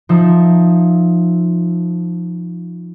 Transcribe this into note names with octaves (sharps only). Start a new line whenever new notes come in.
F3 D#4 E5